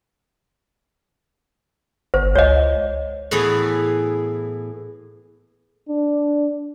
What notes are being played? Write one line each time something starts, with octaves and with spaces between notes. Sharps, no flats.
G1 C5
C#2 C#5 D#5
A2 E3 B3 G#4
D4